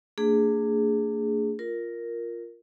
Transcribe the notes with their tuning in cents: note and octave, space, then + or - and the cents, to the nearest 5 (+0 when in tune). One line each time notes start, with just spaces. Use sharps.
A#3 -45 D4 +0 G#4 +0
F4 +0 A#4 +0